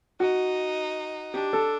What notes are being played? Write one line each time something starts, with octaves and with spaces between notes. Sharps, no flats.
D#4 F#4
D4 G4
A4